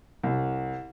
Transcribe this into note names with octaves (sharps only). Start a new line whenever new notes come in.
C2